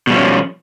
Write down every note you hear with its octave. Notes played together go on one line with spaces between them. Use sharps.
B2 F3 G3 C#4